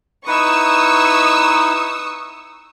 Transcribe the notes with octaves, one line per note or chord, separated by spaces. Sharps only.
D#4 E4 B4 C#6 D#6 E6